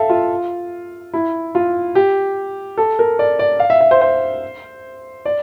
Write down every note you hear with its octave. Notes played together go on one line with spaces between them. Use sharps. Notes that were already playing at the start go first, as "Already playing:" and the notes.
Already playing: A4 E5 F5
F4
E4
F4
G4
A4
A#4
D5
D5
F5
E5
E5
C5
C5
D5